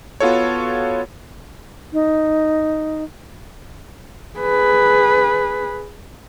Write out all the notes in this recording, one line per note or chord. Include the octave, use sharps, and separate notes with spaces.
B3 F4 F#4 A4 C#5
D#4
G#4 B4